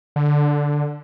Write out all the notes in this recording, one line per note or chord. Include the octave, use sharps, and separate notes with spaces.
D3